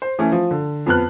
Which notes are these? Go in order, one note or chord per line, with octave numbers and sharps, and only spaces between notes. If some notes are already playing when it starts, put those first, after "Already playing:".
C5
E3 A3 C#4 E4
F3
D3
F2 B3 A5 F6 F#6